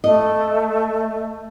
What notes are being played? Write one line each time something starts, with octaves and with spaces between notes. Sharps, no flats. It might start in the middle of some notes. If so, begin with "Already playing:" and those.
A3 D#5